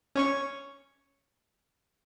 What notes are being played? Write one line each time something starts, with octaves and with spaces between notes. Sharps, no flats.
C#4 C#5 C#6